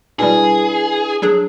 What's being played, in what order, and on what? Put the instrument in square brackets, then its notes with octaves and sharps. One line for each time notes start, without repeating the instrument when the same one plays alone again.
[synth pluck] B2 G3 [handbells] D4 E4 B4 [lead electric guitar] G#4
[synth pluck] F#3 D4 G#4